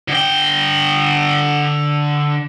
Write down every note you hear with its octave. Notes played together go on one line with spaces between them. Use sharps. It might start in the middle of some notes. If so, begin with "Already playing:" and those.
D3 G5